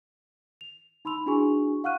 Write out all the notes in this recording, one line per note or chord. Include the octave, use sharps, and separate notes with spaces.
F7
D#4 B5 C6 E6 F7
D4 E4 F#4 G#4 G#5 C#6
F5 F#5 C#6 F6 F#6 D#7